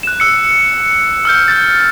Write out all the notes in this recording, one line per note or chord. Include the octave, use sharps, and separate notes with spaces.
F#6 E7
E6 C#7
E6 F6 G6
G6 A6